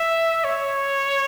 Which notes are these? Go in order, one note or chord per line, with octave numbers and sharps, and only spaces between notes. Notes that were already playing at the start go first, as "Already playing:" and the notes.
Already playing: E5
C#5